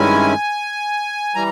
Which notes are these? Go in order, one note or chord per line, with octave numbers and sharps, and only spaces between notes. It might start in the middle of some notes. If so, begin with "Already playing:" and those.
Already playing: G2 D#3 G#3 C#4 E4 G#5
E3 G3 A#5